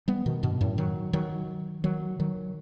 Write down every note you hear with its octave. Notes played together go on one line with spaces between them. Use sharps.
G3 B3
B2 D#3
G2 B2
F#2 A2
D#3 F#3
D#3 F#3
D#3 F#3
D#3 F#3